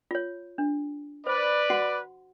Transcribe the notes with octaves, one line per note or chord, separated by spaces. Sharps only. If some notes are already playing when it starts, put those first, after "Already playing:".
F4 C#5
D4
B4 C5 D5
F#4 F#5 C6